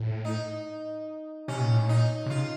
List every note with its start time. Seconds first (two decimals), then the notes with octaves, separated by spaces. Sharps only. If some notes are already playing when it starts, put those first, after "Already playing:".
Already playing: A2
0.25 D#4
1.48 C3 C#4
1.60 A#2
1.72 A2
1.84 A#2
1.89 D#4
2.26 C3
2.30 C#3 F4